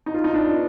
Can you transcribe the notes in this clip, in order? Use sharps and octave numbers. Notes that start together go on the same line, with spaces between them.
D#4
F4
D#4
D4
B3